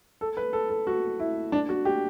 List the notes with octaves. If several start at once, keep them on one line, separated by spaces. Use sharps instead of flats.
A4
B4
A4
A4
F#4
E4
D4
F#4
G4